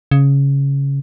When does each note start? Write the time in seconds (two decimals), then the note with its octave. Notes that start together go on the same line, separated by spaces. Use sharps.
0.11 C#3